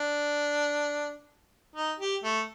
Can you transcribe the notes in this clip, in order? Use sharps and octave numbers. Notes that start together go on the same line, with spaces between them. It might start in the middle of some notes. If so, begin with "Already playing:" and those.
Already playing: D4
D#4
G4
A3